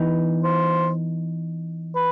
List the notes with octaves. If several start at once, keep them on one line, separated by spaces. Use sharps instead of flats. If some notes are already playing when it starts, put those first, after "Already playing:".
Already playing: E3 B3 D#4
C5
B4